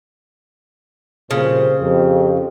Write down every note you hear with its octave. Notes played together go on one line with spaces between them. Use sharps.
C2 F2 A#2 C#3 C5
F2 G4 C5